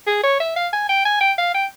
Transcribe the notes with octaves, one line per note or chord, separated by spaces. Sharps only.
G#4
C#5
E5
F5
G#5
G5
G#5
G5
F5
G5